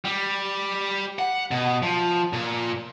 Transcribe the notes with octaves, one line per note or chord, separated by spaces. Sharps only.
G3
F#5
B2
F3
A#2